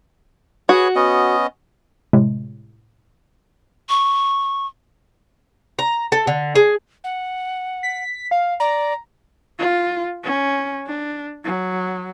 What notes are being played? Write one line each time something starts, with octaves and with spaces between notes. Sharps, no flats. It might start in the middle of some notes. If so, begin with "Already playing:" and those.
F#4 G#4 B4 C#5
B3 C#4 D#5
A2 C3 G#3
C#6
A#5
A4
D3
G#4
F#5
B6
F5
D5 A#5
F4
C#4
D4
F#3